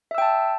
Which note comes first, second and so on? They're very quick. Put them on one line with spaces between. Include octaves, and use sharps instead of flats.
E5 E6 G5 A5